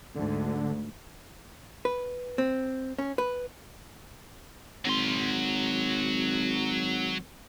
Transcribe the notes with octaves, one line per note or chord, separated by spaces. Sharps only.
D2 G#2 D3
B4
C4
C#4
B4
G#1 F#3 C6